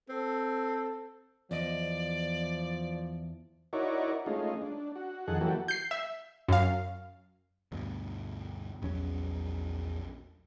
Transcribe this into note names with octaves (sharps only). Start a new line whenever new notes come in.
C4 A4
E2 F3 D5 D#5
D#4 E4 F#4 A#4 C#5 D5
G#3 A3 C#4 D#4 F4
D4
F#4
F2 D#3 G#4 A4 F#5
E3 F#3 A#3 F#4 G4 A4
G6 C7
E5
F#2 F5
D2 G2 B2
A#1 E2 F#3 C#4